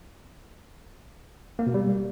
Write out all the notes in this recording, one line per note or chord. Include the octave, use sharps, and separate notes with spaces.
A#3
B2
G3